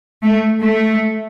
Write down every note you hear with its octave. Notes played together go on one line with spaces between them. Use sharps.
A3
A3